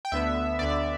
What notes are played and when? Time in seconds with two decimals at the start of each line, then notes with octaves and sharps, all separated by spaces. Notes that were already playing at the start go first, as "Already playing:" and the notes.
0.05 G5
0.12 D2 D3 B3 E5
0.59 D2 D3 B3 D5